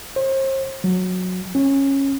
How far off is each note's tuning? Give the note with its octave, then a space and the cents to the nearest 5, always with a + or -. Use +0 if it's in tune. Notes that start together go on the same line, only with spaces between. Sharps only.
C5 +40
F#3 -15
C#4 -15